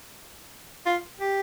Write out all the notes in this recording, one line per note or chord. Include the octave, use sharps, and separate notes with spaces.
F4
G4